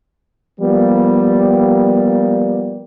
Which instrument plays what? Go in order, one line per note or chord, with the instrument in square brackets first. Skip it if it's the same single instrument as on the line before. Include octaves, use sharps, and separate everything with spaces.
[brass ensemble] F3 G3 A#3 B3